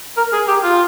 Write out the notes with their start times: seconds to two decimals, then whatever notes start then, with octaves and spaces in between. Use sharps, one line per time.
0.17 A#4
0.33 G#4
0.48 G4
0.63 F4